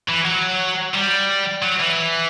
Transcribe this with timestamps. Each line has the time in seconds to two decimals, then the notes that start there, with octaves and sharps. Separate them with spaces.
0.08 E3
0.24 F#3
0.94 G3
1.62 F#3
1.80 E3